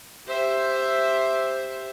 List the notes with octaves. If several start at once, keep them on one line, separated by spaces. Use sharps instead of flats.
G4 C5 E5